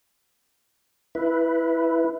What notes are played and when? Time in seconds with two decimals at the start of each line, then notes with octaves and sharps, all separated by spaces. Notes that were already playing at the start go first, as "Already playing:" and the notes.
1.15 E4 B4